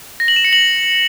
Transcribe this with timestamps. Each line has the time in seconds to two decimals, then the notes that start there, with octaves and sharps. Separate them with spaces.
0.20 A#6
0.28 F#7
0.36 E7
0.44 C#7
0.53 F#7